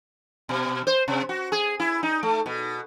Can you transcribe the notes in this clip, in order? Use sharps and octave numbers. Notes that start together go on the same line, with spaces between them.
B2
C5
C3
F#4
G#4
E4
D#4
A3
B2